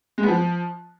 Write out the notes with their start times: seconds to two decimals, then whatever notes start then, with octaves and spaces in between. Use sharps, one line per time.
0.18 G#3
0.23 B3
0.28 F3